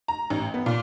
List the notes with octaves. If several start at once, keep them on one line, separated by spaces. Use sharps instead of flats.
A#5
A1
B3
A#2